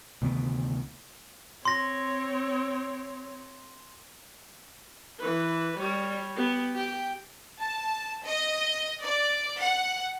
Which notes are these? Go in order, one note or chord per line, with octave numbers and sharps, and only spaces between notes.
D2 C3 D#3 B3
C4 C#5 C6 A#6
E3 B4
G3 C#5
B3 G4
G4 G5
A5
D#5
D5
F#5